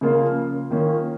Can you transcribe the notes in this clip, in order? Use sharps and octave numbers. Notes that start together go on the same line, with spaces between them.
C#3 F3 A#3 F4
D#3 A#3 C#4 F4